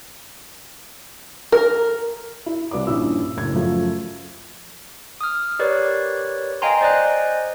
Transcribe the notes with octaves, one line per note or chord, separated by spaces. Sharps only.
A#4
E4
C2 B4 D5 D6
A#1 G2 C#4 E4 E6
F#1 A2 G#6
F#2 F3 A3 F4
D#6 F6
G4 A#4 B4 C#5 D5
D#5 F5 G5 G#5 A#5 C6
C5 D5 D#5 G#5 F#6